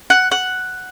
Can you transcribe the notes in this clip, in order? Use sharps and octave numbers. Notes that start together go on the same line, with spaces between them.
F#5
F#5